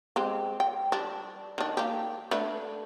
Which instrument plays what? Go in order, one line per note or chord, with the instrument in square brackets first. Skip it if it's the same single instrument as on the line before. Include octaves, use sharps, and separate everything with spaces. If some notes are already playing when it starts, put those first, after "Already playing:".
[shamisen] G#3 C4 G4
G5
G3 D4
D#3 D4
A#3 G4
A3 D4 B4